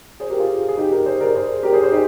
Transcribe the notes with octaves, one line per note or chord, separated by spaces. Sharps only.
G#4 C5
G4 A#4
F4 G#4
G#4
D#4 G4
G4 A#4
G#4 C5
A#4 D5
G#4 C5
G4 A#4
G#4 C5
G#4 C5
D#4 G4